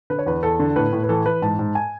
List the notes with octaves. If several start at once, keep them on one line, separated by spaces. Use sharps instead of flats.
D3 B4
C#5
E2 B4
E2 A4
D3
A2 B4
A2
B4
E3 A4
E3 B4
G#2 A5
G#2
G#5